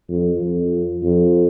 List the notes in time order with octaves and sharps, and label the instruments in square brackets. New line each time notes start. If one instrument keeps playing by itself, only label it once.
[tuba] F2
F2
F2